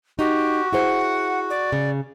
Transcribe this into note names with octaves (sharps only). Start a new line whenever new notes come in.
D#4 F#4 G4
E4 G#4 C5 F#5
D5
C#3